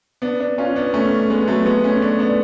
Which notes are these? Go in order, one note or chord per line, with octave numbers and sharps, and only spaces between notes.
B3 D4
B3 D4
C#4 F4
B3 D4
A3 C#4
G#3 B3
F#3 A3
G#3 B3
A3 C#4
B3 D4
B3 D4